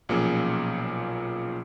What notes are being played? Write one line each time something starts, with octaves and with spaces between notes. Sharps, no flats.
B1 A#2 F3 A#3 C#4 G#4